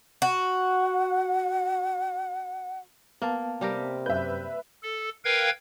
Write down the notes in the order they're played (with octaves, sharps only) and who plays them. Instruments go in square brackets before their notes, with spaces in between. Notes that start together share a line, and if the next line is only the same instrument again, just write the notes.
[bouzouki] F#4 [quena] F#5
[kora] A#3 [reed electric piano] B3 F5 A5
[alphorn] C3 [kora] G3 G4 A#4
[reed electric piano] F#2 G6 [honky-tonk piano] B4 E5
[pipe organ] A4
A#4 B4 F5 G5 G#6